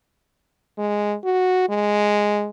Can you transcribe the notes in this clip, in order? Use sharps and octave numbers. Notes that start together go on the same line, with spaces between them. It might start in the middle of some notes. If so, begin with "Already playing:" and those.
G#3
F#4
G#3